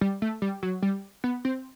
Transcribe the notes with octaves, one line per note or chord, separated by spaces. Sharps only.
G3
A3
G3
F#3
G3
B3
C4